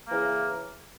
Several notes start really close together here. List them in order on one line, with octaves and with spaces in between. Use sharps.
A#3 E3 C#3